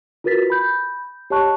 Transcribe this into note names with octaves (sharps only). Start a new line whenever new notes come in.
F4 F#4 A#4 B4 A6 B6
B5 G6
G4 C#5 D#5 A5 C#6 F#6